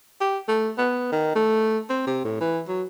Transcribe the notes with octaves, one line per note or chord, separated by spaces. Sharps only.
G4
A3
B3
D#3
A3
C4
C3
A2
E3
F#3